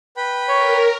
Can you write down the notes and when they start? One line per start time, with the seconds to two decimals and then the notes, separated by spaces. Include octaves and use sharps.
0.17 B4 G5 B5
0.49 A#4 C#5